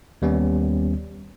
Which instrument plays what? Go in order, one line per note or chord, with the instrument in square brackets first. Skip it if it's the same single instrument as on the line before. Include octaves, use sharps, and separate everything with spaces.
[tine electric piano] D#2 G3 B3 C#4